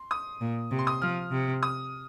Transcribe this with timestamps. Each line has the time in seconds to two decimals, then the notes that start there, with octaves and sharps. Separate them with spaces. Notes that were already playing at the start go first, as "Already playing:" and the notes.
Already playing: C6
0.11 D#6
0.41 A#2
0.71 C3
0.79 C6
0.87 D#6
1.02 F3 F6
1.32 C3
1.63 D#6